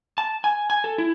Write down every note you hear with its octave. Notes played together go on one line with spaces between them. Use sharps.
A5
G#5
G#5
A4
E4